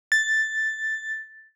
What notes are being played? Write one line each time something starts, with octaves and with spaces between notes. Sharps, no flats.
A6